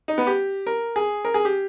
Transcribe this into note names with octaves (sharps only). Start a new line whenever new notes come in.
D#4
B3
G4
A#4
G#4
A#4
G#4
G4